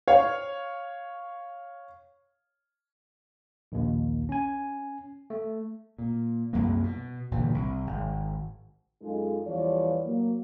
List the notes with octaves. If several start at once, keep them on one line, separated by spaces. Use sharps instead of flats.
C#5 F5
A#1 D#2
C#4 G#5
A3
A#2
C2 F#2 F#3 A#3
B2
G1 A#2 D3 E3
C2
G#1
F#2 G#3 D#4 F4 G#4 A4
E2 E3 F3 G3 C#5 D5
F#3 A#3